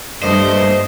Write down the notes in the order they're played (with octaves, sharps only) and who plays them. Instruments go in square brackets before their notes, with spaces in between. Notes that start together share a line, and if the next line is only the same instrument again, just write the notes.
[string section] G2 [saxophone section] A3 A#3 D#5 [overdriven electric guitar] C5